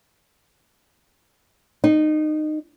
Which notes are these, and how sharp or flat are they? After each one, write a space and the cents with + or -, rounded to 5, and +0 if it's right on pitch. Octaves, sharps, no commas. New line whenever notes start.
D#4 -20